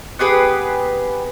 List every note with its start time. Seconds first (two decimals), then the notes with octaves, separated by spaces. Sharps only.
0.19 B3 G4 G#4 B4